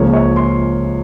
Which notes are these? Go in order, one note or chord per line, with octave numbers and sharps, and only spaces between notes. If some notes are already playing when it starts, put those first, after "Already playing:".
Already playing: C#2 C#3 F3 A#3 C#5
C#5
C6